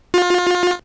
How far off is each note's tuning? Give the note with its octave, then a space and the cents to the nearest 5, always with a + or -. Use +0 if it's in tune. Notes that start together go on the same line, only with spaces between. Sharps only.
F4 +30